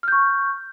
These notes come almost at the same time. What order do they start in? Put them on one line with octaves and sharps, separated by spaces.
F6 G6 C#6